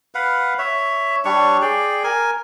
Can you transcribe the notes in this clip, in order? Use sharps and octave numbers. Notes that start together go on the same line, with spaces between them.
B4 F5 F#5
C#5 E5
G3 D4 C#5 C#6
G#4 D5 G5
A#4 G#5